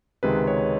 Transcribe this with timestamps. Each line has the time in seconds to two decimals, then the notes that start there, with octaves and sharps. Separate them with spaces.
0.23 C#2 C3 D#3 G#3 B4
0.47 C#5